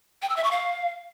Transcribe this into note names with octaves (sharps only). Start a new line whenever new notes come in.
G5
E6
E5
C#6
F5